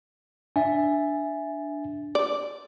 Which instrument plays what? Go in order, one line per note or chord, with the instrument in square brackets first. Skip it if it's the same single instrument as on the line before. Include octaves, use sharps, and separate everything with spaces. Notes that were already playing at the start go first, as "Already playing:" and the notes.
[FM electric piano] D4 [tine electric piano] E5 G#5
[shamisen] D5